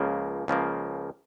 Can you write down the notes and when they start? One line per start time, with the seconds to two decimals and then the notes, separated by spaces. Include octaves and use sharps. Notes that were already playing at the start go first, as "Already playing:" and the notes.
Already playing: C#2 C#3 F3 A#3
0.48 C#2 C#3 F3 A#3